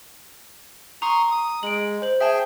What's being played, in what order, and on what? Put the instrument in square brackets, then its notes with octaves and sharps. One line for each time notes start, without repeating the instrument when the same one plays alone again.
[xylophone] A#5 [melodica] C6 C#6 D#6
[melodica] D#6
[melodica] G#3 [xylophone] D7 F#7
[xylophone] C5 F#7
[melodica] G#4 G5 [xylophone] E5 A5